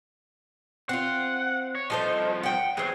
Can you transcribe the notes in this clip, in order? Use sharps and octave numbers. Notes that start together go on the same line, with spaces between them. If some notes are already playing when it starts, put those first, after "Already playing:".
C4 F4 F#5
C#5
C2 F3 D#4 A4 C5
F#5 G5
E2 F#3 G#4 C5